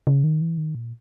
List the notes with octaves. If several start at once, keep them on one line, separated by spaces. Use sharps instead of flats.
C#3
D#3
E3
D#3
A#2